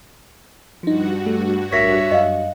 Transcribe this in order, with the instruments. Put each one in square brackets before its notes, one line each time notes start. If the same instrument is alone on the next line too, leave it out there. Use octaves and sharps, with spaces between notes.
[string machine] G2 F#4 [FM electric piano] F3 D#4
[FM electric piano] G3 A3
[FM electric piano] B1 A2 A#4 [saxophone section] C#5 E5 [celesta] A#6 B6
[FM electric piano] F#2 [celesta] D#5 F5